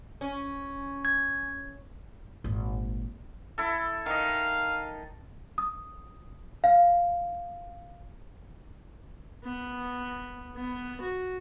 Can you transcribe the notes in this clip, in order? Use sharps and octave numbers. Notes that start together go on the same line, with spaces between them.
C#4
G#6
G#1 A#2
E4 A4
D#3 D#5 F5
D#6
F5
B3
B3
F#4